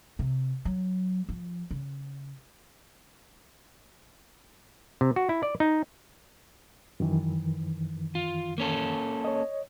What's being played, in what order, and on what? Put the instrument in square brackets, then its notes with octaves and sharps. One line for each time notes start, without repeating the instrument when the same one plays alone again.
[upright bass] C3
F#3
F3
C#3
[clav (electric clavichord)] C3
F#4
E4
D5
D#4
[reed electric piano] F#2 D#3 E3
[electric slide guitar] F4
A#3 C#4 A4
[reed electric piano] C#5 D#5